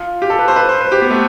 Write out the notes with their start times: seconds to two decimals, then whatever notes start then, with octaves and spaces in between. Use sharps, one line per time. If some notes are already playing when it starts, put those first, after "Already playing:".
Already playing: F4
0.22 G4
0.30 A4
0.39 B4
0.48 C5
0.56 B4
0.69 C5
0.81 B4
0.92 G4
1.02 B3
1.11 A3